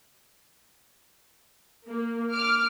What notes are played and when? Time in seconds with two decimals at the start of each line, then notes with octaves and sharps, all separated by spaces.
1.86 A#3
2.32 D6 F6